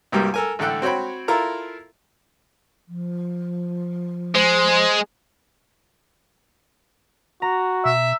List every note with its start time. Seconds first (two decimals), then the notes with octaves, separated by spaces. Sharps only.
0.12 C2 G2 F#3 G3 A#3
0.34 A4 A#4 G#5
0.59 A1 D3 A4 G5 F#6
0.82 C4 F#4 C#5 G5 B5
1.28 E4 F4 A4 A#4 A#5
2.88 F3
4.35 G#3 C5
7.42 F#4 A#5
7.85 B2 E5